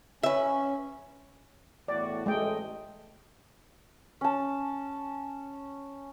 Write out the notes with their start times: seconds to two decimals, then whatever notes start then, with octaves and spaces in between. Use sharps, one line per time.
0.23 C#4 B4 E5
1.88 E2 A2 F#4 D5
2.26 A1 G#3 A3 A4 D#5 G5
4.21 C#4 A5